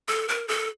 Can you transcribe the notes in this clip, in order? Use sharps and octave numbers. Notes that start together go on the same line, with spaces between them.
A4
A#4
A4